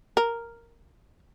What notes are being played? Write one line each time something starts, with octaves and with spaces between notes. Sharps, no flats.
A#4